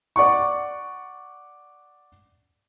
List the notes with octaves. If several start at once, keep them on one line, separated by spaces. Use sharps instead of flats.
D5 F#5 C#6